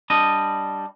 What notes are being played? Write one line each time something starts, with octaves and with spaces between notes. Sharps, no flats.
G3 D4 D#5